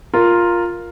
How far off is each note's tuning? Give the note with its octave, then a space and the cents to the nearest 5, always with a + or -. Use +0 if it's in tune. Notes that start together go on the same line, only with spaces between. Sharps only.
F4 +0 A#4 +0